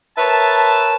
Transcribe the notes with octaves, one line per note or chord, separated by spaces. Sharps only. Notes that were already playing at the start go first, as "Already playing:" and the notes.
A#4 B4 C#5 E5 A5